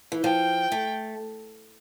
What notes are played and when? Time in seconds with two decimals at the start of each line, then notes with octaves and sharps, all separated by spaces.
0.12 E3
0.24 F3 G5
0.72 A3